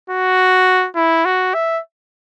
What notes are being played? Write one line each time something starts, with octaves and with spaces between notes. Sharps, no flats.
F#4
E4
F#4
E5